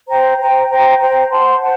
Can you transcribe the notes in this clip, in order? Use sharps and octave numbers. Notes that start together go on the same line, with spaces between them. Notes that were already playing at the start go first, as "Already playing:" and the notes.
C5 G5 A#5
C5 G5 A#5
C5 G5 A#5
C5 G5 A#5
C5 F#5 A5 C6
C5 F#5 A5